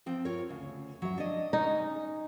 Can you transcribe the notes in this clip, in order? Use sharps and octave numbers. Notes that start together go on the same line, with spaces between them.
F3 C4 G5
F4 A#4 C#5
D2 C#3
F#3 E5
D4 D#5
C#4 D#4